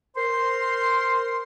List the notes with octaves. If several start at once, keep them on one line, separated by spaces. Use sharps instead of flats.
A#4 C5 C6